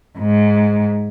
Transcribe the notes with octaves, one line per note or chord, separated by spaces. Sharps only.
G#2